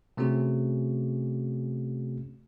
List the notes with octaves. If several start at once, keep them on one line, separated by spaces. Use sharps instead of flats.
C3 A3 C4 C#4 F#4 G#4